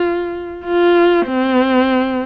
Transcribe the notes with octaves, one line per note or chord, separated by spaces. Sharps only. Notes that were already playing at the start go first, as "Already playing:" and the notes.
Already playing: F4
F4
C4